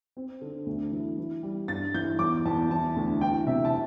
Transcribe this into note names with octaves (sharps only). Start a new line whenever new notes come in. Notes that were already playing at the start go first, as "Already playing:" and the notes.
C4
D3
D2
E3
E3
G3
G2 A6
E3 G6
E2 D6
E2 A5
E3 A5
D2
E3 G5
C3 E5
A5